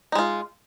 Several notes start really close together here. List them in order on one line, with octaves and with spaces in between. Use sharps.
D#4 G#3 F4